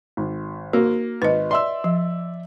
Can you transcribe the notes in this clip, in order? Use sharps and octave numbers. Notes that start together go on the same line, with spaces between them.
G#1
A#3 F#4
G#1 B4 D#5
D5 E5 C6 E6
F3